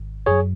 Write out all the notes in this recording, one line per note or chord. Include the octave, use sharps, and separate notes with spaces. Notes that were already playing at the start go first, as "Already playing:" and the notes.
Already playing: G#1
F#2 F#3 G#4 C#5